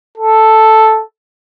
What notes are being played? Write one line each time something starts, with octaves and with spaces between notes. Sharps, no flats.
A4